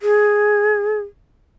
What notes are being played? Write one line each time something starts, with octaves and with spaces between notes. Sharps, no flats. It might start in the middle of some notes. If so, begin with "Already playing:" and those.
G#4